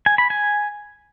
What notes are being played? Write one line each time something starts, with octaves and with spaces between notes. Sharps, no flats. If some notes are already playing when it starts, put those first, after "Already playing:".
G#5
B5
G#5